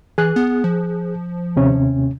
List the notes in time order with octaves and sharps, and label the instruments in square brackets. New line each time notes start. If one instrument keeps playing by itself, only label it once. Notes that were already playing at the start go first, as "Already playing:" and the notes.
[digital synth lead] E3 [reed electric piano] G#4 F#6
[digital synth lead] B3
F3
[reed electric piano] D#2 C3 C#4